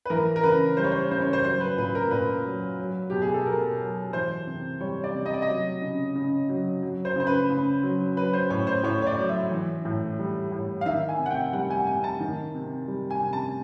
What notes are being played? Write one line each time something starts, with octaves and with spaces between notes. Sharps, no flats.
B4
E3 A#4
A#4
C#3 B4
G3 C5
C#5
C5
C#3 C5
C#5
C5
F#3 C5
B4
A#2 B4
A#4
A#2 B4
F#3
F#3
B2 G4
G#4
A4
B2 A#4
F#3
E3 C5
C3
G3 C#5
D5
C3
D#5
D5
D#5
F#3
C#3
C#3
F#3
F#3
C5
C#3 C5
B4
C#3
F#3
F#3 B4
C5
A2 C#5
C5
A2 C#5
C#5
D5
F#3
E5
E3
A2
G3
A2
F5
D#3 E5
G#5
C3
F#5
G5
G3 F#5
G#5
C3 G#5
A5
D#3
C3
G3
G#5
C3
A5